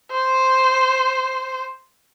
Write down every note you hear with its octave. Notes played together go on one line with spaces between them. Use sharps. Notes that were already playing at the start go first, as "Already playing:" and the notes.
C5